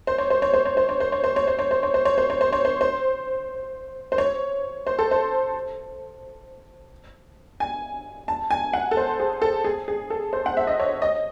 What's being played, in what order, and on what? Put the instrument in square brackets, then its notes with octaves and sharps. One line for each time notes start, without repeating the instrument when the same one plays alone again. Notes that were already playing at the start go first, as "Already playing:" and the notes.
[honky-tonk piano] C5
C#5
C5
C#5
C5
C#5
C5
C#5
C5
C#5
C5
C#5
C5
C#5
C5
C#5
C5
C#5
C5
C#5
C5
C#5
C5
C5
C5
C#5
C5
A4
C5
G#5
A5
G#5
F#5
A4
C5
G#4
A4
G#4
G#4
A4
C5
F#5
E5
D#5
C#5
D#5